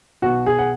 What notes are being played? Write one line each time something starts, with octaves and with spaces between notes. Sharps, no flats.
B1 B2 F#4
G#4
F#5